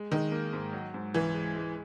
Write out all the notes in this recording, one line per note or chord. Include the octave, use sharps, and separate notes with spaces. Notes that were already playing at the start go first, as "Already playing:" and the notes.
Already playing: G#3
D#3 G#3
A#3
G#2
F#3
G#2
C#2 E3
G#3
G#3